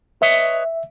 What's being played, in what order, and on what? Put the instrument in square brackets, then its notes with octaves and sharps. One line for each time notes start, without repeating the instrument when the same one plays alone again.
[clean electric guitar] B4 C#5 D#5 [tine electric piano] E5